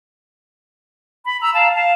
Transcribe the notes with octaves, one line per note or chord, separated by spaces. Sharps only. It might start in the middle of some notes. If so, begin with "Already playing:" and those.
B5
A#5 E6
F5 A5 A#5
F5 A5